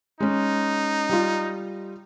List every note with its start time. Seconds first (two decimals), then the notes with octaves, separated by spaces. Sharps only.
0.20 G#3 C#4 D#4
1.09 G3 F4